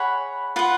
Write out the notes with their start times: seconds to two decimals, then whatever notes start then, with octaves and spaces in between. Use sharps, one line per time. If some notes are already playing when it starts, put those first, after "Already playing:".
Already playing: G#4 C#5 F#5 B5
0.56 F4 B4 F#5